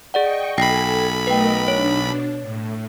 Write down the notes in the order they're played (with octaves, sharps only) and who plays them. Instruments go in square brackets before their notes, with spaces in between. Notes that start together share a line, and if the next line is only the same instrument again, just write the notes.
[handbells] G#4 D5 F#5 [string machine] D#5 G5 C#6
[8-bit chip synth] B1 B5 [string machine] A4 G#5 [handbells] G5 A#6 C7
[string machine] A3 A#4 D#5 [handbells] B4 G5
[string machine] B2 D4 [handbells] C#5
[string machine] A2